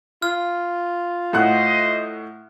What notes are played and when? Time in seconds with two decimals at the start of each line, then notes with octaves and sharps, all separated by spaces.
0.22 F4 F6
1.33 A2 C5 D#5 F#5 F#6